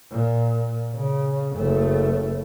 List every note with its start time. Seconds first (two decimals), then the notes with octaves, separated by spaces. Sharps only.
0.11 A#2
0.94 C#3
1.56 F#1 A3